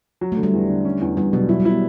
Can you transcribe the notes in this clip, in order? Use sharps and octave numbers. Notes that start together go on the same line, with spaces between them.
F#3
A3
D3
G3
E2
D3
C#4
E2
E2 G3
B2 F#3
F#3 E4
G3
E4
B3